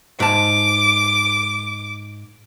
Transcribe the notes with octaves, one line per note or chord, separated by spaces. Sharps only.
G#2 A5 D6